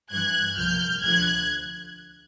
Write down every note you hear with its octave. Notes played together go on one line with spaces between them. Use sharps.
G2 E3 F#6 G#6
C2 A#2 F3 F6 G6
D2 D3 F3 F#6 G#6